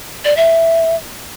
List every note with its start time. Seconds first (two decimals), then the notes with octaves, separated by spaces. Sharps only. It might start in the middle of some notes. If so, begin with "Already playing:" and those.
0.24 D5
0.37 E5